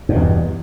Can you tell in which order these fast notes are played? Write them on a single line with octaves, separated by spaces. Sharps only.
G2 B2 E2